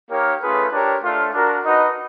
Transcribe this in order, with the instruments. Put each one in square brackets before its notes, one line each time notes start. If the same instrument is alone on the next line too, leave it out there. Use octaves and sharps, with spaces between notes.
[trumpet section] A#3 D#4 G4 A#4 C#5
A3 C#4 F4 G#4 B4
D4 G4 A#4 C#5
A3 D4 F4
D4 F#4 A#4
D#4 F#4 B4 D#5 F#5